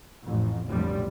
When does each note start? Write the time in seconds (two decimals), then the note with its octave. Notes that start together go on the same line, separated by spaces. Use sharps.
0.24 A1 F2
0.67 F1 B1 F2 A2 D3 G3